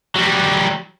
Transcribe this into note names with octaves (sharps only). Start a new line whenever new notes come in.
F#3 G3